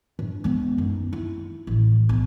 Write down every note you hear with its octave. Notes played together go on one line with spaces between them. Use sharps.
G2
G#3 B3
F#2 D#4
E4
A1
B1